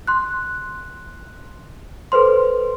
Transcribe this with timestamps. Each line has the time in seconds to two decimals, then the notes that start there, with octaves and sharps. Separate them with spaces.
0.07 C6 F#6
2.12 A4 B4 C5 C6